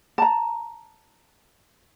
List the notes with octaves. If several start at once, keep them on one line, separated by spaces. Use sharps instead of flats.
A5 A#5